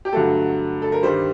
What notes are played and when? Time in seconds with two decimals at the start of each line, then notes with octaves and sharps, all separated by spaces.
0.05 G4
0.12 G2 D3 F#3 A3 A4
0.82 A4
0.92 A#4
1.03 G2 D#3 G3 C5